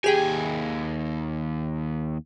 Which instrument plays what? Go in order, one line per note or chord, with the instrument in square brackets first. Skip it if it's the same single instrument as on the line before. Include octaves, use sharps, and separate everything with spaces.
[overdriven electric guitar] D#2 G#5 [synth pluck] G4 G#4 G5